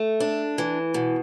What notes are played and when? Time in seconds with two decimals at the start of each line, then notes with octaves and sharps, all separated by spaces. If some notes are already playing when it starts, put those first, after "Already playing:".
Already playing: A3
0.20 D4
0.58 E3
0.94 B2